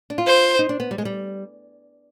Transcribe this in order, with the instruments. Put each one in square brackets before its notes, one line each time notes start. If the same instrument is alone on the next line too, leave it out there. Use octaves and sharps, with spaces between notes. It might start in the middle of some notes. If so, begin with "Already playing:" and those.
[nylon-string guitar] D4
F4
[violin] C5
[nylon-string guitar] D#4
D4
B3
G3
G#3
G3